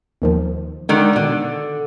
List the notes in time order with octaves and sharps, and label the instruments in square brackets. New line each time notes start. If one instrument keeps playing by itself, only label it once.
[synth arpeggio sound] D#2 D#3 F3
[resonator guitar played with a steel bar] D3 D#3 [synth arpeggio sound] G#3
[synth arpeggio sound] B2 D#3 [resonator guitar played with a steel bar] D3